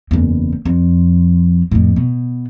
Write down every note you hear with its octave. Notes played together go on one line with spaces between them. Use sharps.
F#1 E2
F2
F2 A2
B2